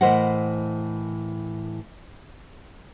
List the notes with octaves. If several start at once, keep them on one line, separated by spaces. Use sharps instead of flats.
A2 E3 A#4 C5 D#5 F#5